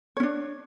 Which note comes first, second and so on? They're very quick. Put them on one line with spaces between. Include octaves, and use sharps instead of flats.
C#5 C#4 D4